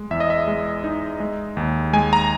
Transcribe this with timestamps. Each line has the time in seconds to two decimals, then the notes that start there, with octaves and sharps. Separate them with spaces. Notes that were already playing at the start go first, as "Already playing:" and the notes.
Already playing: G#3
0.11 E2 E5
0.20 D#5
0.30 E5
0.47 G#3
0.84 D#4
1.20 G#3
1.57 D#2
1.93 G#3 G#5
2.13 A#5